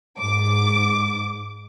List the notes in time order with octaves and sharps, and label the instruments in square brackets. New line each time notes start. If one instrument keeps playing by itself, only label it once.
[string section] G#2 D6